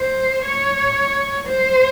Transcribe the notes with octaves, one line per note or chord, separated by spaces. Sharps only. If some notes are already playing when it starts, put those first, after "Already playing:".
Already playing: C5
C#5
C5